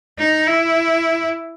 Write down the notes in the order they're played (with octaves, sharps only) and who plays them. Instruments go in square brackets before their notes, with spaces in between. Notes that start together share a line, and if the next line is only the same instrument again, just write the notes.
[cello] D#4
E4